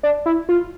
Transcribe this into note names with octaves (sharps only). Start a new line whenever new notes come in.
D4
E4
F4